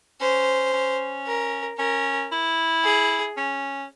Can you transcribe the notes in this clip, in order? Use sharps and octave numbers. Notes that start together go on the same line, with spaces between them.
C#4 C5
C#4
A#4
C#4 A#4
E4
G#4
C#4